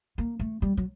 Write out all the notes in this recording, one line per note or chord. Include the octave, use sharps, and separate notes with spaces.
A#3
A3
G3
F#3